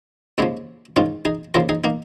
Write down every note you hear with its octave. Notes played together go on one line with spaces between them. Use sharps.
D#2 C#3 F3 G#3 C#4
G#2 D#3 C#4 F4
D#4 G#4
D#2 C#3 F3 F4 A#4
D#4 G#4
A#3 D#4